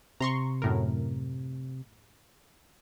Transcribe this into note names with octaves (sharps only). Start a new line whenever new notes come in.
C3 A#5 C6 C#6
F#2 A2 A#4